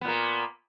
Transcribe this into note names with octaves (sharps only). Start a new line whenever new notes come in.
A#2 A#3 B3